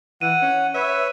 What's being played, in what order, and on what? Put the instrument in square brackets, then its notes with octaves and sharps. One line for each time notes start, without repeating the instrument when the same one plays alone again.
[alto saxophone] E3 [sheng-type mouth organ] F#5 [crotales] D#7
[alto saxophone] C#4
[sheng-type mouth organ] B4 C#5 [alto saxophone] E5